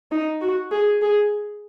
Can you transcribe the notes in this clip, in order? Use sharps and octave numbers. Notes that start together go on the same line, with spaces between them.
D#4
F#4
G#4
G#4